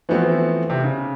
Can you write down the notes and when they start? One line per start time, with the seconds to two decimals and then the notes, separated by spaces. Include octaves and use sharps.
0.09 E3 F3 A3 B3 C4 F#4
0.70 C3
0.83 C#3